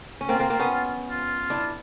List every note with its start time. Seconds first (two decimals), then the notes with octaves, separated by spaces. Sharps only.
0.21 C#4
0.29 A#3 C4 F4
0.39 A#3 C4
0.50 A#3 C4
0.59 B3 C#4
1.10 F4
1.50 D4 E4